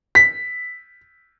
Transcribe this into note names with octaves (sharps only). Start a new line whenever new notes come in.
B6